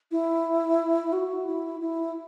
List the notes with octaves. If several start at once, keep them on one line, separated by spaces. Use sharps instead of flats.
E4
F#4
E4
E4